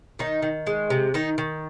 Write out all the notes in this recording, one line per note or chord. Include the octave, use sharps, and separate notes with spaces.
D#3 D#4
D#3
G#3
C3
D#3 D#4
D#3